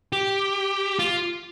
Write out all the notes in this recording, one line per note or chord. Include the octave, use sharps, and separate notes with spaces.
G4
F4